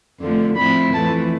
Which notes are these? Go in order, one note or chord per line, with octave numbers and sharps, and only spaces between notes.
F2 D3 F3 A3
A2 F3 C4 E4 B5
F2 E3 A3 A5